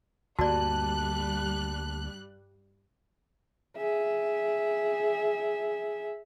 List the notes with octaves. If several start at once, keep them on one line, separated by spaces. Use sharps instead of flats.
D2 G2 G3 A#3 F#4 D5 A5 F#6
G#4 E5